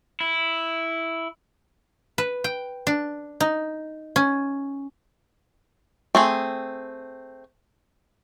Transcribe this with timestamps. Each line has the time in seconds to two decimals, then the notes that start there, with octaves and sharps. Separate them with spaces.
0.20 E4
2.18 B4
2.44 G5
2.87 D4
3.40 D#4
4.16 C#4
6.15 A3 C4 G#4